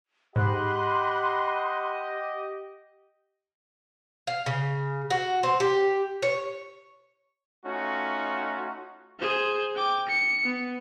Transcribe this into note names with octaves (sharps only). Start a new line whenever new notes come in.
G#2 G4 D#5 F#5 B5 C6 F#6
F5
C#3
F#4
C4
G4
C#5
A3 C#4 D#4 F4 F#4
G#4 C5
G5 D6
C#7
B3